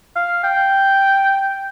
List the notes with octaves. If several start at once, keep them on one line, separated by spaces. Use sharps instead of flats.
F5
G5